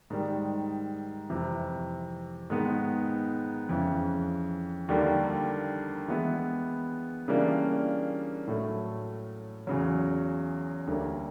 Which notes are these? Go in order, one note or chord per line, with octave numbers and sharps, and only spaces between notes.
G#2 D#3 G3
F2 C3 E3
G#2 D#3 G#3 B3
F2 C#3 E3
D#2 D3 G3 A#3
E3 G#3 B3 E4
C#3 E3 G3 A#3 D4
A2 F#3 A3
E2 C#3 F#3
D2 D3 G3 A#3